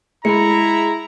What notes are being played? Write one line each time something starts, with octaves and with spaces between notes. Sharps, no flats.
G#3 E4 A#5 B5 C#7